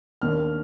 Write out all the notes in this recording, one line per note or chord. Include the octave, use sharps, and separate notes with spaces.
D#2 D#3 A#3 D4 F6